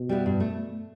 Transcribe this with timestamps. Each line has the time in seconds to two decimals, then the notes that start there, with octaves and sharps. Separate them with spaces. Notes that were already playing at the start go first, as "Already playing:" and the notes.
Already playing: B2
0.09 G3 B3 E4
0.26 G2
0.40 A3